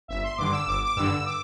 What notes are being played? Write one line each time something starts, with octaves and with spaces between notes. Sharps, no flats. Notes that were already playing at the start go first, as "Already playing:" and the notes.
G1 E5
C6
G2 D3 D6
E6
G1 D6
D6
G2 D3 E6
D6